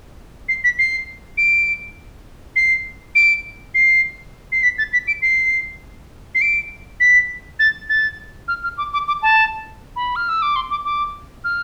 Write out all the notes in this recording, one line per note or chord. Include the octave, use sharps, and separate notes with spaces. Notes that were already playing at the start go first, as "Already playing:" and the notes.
C7
B6
C7
D7
C7
D7
C7
C7
B6
A6
B6
D7
C7
C7
D7
B6
A6
A6
F6
F6
D6
D6
D6
A5
B5
F6
E6
D6
C6
D6
D6
F6